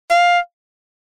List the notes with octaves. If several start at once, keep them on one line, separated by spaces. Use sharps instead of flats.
F5